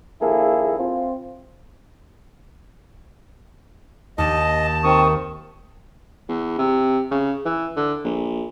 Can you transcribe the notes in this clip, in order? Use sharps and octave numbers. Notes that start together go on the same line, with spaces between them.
A#1 D#2 A#3 E4 G#4 A4
C4 F4
D#2 D#5 A5
D#3 C4 C#6 D#6
E2
C3
C#3
E3
D3
A#1